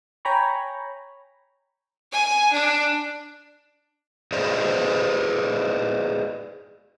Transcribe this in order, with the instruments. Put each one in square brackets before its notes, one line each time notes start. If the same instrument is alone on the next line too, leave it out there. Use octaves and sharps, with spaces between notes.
[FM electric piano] C#5 G5 G#5 A#5 B5 C#6
[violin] G#5
D4
[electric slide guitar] G#4 B4 C5 D5 D#5